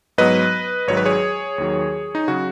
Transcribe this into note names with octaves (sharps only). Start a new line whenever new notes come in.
G#2 F#3 B3 B4 D#5
G#1 G#2 F#3 C#5
B4
G#4 C#5
D#2 D#3 F#3
D#4
C#3 F#3 F#4